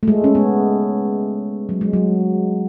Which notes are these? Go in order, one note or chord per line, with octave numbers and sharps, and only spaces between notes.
A3
G#3
C#4
B3
F#3
G#3
F#3